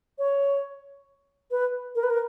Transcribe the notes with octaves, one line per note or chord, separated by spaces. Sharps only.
C#5
B4
A#4
B4
A#4